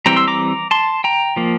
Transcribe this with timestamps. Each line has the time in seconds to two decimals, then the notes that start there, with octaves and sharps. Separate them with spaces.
0.06 E3 G3 C4 G5 A#5
0.16 C6 E6
0.28 A#5 D6
0.71 A5 C6
1.04 G5 A#5
1.36 F3 A#3